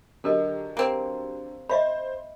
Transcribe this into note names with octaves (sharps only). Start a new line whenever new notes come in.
D3 F#3 G4 A4 A#4 D#5
A#3 C4
C5 D#5 E5 B5